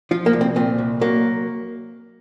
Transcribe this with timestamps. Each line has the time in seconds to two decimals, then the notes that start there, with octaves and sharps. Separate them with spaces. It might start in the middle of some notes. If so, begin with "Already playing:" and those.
0.11 F3 F4
0.26 A#3
0.33 C2
0.41 C4
0.56 A#2 C4
0.78 C2
1.01 F#3 A#3